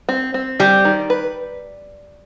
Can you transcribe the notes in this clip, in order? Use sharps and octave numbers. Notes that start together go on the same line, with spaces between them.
C4
C4
G3 G4
D#3
B4